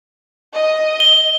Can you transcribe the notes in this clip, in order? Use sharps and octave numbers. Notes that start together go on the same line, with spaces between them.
D#5
G7